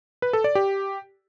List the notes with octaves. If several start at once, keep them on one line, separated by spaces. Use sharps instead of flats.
B4
A4
D5
G4